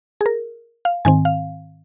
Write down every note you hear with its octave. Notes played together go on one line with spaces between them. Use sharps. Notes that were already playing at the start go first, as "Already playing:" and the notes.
G#4
A#4
F5
G#2 D#3 C4 G#5
F5